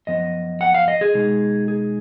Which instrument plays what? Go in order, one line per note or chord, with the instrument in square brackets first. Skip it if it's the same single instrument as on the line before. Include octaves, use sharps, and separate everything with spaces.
[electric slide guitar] F#2 F3 B3 D#5
F#5
F5
D#5
G#4
B2 G#3 D#4
G#4